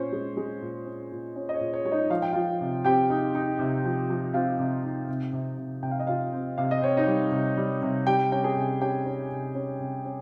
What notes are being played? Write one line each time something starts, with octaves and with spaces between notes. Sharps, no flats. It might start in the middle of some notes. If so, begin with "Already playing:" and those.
Already playing: A#2 C#4 C5 C#5
G#3
G#3
A#2
C#4
A#2
C#4 C#5
D#5
C#5
A#2
C#5
G#3 C#5
D#4 D#5
F3 F5
G5
F3 F4 F5
C3
C4 G4 G5
D#4
D#4
C3
F3
F3
C4 F4 F5
C3
D#4
C3
C3
C3
C3 G5
F5
D#5
C3 F4 F5
C4
C3 F5
D#5
C4 C#5
D#4 D#5
G3
C3
G3
C3
G3 G4 G5
C#4 G5
G#4 G#5
C3
C#4 G4 G5
C#4
C3
C#4
C3
C#4